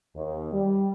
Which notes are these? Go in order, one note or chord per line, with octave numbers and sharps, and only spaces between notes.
D#2
G3